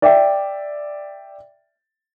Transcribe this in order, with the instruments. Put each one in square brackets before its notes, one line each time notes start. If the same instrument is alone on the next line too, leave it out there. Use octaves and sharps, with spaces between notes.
[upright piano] D5 E5 G5